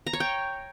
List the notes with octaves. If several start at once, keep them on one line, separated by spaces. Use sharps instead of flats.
A#5
C#5
G5